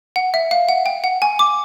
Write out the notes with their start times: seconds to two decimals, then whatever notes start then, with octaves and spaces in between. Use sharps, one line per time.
0.16 F#5
0.34 E5
0.51 F5
0.69 F#5
0.86 G5
1.04 F#5
1.22 G#5
1.39 D6